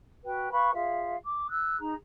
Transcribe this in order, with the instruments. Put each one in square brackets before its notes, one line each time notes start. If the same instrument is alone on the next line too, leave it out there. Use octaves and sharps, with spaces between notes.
[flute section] F#4 B4 G5
B4 F5 B5 C#6
F4 G#4 E5 F5
D6
E6 F#6
D#4 G#4 A#5